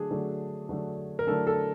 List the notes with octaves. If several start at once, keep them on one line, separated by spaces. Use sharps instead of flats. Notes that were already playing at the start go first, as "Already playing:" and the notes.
Already playing: D3 F#3 A3 D4 G#4
D3 F#3 A3 D4
D3 F#3 A3 D4
A#4
D3 F#3 A3 D4 A4
A4